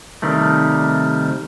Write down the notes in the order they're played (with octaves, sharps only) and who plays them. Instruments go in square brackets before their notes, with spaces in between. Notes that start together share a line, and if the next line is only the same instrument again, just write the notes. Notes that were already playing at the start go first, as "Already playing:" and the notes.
[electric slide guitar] C3 D#3 G3 A3